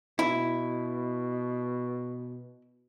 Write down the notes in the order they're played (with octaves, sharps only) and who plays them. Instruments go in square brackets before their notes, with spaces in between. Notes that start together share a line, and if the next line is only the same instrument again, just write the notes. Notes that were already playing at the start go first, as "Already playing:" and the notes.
[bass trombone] B2 [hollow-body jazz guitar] E4